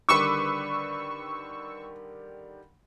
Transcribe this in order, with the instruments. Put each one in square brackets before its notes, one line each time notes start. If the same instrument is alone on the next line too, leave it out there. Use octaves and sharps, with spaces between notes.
[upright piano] D3 D#3 G3 [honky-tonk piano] B4 D6 [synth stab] C#6 E6